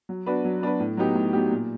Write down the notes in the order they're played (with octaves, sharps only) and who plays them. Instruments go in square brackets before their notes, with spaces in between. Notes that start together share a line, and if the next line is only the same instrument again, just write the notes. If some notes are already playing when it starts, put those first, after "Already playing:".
[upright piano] F#3
B3 D4 F#4 B4
F#3
B3 D4 F#4 B4
A2
F#3 B3 D#4 G4
A2
F#3 B3 D#4 G4
A#2